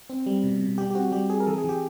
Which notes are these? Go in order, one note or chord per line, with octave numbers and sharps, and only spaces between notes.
C4
G3
B2
B2
G3 G4
G4
C4 F#4
G3 G4
C4 G#4
A#4
E3 A4
G#4
E3 G4